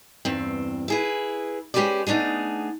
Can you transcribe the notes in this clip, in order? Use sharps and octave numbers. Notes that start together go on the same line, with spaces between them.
E2 G2 C4
E4 G#4 B4
G#3 C#4 G4 B4 C5 D5
A3 B3 D4 D#4 G#4